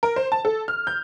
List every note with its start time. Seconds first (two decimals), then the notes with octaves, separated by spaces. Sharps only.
0.03 A#4
0.16 C5
0.32 A5
0.45 A4
0.68 F6
0.87 G6